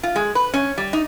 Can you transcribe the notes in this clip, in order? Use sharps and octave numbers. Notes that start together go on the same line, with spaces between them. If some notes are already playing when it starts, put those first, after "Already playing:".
F4
G#3
B4
C#4
G3
D#4